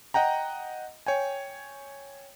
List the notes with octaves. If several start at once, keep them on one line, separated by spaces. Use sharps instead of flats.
D#5 F#5 G5 A#5
C#5 G5 G#5